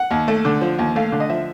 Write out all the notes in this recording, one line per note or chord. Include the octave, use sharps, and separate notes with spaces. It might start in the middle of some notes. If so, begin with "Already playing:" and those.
Already playing: F#5
D#2
A3
D3
F3
D#2
A3 F5
D3
D#5
F3 E5